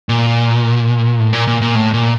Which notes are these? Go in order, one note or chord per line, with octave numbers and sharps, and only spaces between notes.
A#2
A2
A#2
A#2
A#2
A2
A#2